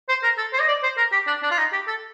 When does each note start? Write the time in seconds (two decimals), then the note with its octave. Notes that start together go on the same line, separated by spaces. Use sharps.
0.09 C5
0.23 A#4
0.38 A4
0.53 C5
0.61 D#5
0.68 D5
0.83 C5
0.97 A#4
1.12 G4
1.27 D4
1.43 D4
1.51 F4
1.58 D#4
1.72 G4
1.88 A4